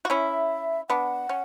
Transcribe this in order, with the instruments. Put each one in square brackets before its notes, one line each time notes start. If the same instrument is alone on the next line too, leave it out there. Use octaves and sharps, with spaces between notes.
[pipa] F#4
[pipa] C#4 E4 [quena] E5
[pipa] B3 D4 [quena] F#5
[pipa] C#4